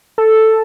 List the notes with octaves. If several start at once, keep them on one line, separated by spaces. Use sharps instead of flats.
A4